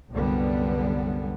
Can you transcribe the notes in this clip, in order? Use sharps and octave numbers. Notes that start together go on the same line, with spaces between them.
C2 F#2 D3 G3 B3